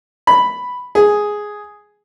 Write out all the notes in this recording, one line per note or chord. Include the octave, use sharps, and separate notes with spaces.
B5
G#4